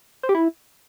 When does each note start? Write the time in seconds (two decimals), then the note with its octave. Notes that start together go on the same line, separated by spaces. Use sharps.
0.23 C5
0.29 G4
0.35 E4